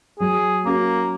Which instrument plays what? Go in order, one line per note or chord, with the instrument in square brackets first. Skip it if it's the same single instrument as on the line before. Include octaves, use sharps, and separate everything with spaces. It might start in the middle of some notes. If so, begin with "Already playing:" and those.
[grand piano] F#3 [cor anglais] G#4
[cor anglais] A#3 [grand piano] C#4 F#4